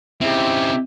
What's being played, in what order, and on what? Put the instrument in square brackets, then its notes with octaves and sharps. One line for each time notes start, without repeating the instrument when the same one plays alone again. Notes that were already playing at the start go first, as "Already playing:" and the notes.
[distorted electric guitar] C#3 C4 [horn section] D#4 E4 G4